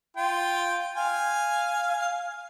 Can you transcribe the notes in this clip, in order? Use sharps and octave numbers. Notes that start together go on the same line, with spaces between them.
F4 G5
F5 G#5